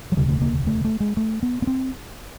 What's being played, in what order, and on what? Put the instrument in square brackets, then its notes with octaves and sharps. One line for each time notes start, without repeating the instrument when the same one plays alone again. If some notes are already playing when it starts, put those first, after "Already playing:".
[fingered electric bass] F#3
E1 D2 C#3 G3
A3
A#3
A3
A3
G#3
A3
B3
B3
C4